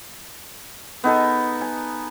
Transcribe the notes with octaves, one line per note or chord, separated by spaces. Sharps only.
B3 D#4 A4
G#5